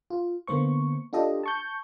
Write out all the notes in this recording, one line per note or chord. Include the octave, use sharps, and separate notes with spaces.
F4
D3 A#3 B3 C5 C#6
D4 F4 G4 A4 D#5
A5 C#6 G6